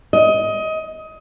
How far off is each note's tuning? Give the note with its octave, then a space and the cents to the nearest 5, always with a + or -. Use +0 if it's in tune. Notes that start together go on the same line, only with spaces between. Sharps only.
D#5 +20